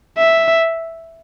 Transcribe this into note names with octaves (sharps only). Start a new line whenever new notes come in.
E5